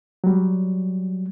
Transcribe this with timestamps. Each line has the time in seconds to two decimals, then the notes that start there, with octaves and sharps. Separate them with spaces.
0.24 F#3 G3